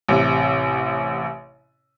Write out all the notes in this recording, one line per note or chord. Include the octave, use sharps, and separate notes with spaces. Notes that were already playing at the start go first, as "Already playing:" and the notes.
A1 C3